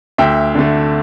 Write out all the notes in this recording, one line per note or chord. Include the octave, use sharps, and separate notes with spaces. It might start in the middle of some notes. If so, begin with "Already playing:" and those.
D2 E5 G5
D3 A3